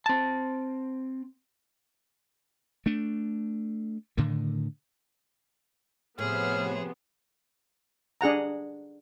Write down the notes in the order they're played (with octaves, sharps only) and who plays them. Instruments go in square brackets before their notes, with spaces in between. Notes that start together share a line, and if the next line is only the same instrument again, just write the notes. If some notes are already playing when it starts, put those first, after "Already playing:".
[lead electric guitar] C4 A5
[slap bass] A3 D4
A2 D3 D#3
[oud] A2 [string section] C3 F3 B3 [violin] G#4 C5 [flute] F6
[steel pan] D4 G#4 F#5 A#5